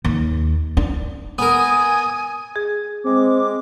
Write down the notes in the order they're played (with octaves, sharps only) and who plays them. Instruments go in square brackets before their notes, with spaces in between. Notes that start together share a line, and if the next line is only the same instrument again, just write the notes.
[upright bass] D#2
D4
[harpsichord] B3 A#4 [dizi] G#5 [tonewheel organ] D#6
[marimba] G#4
[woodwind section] G#3 D6 [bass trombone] C4